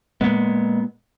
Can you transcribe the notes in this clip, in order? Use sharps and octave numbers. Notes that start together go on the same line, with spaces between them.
A#2 G#3 B3